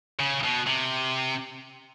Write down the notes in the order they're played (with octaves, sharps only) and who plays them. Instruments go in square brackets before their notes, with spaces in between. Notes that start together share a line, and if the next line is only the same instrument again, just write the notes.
[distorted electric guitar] C#3
B2
C3